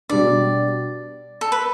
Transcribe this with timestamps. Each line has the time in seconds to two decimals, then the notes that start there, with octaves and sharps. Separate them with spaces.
0.09 B2 G3 D4 D5
1.41 A4
1.52 B4